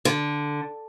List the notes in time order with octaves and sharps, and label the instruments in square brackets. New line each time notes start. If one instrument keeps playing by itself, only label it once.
[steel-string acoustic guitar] D3